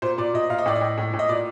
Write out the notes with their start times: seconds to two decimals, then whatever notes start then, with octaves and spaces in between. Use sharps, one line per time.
0.02 A#2 C5
0.18 A#2 D5
0.34 A#2 D#5
0.50 A#2 F5
0.58 D#5
0.66 A2 D5
0.75 D#5
0.81 A2
0.98 A2
1.13 A2
1.19 D#5
1.29 A#2 D5